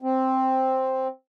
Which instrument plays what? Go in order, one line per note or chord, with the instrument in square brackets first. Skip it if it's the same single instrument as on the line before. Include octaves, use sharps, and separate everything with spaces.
[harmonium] C4